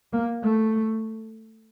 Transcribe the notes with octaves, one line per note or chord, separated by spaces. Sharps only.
A#3
A3